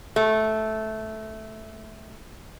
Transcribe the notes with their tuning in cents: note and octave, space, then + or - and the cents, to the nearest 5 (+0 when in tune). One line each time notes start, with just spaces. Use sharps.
A3 -10